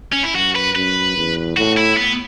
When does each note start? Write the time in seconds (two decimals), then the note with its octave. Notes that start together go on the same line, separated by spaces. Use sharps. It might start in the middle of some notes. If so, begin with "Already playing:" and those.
0.13 C#4
0.23 E4
0.34 F#2 F#4
0.55 B4
0.75 F#2 B4
1.16 E2
1.57 A2 F#4
1.77 E4
1.97 B3